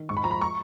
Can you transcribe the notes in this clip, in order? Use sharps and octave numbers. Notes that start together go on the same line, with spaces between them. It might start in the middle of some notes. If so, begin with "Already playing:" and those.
Already playing: D#3
G#2 C#6
B5
F3 A#5
B5
C#6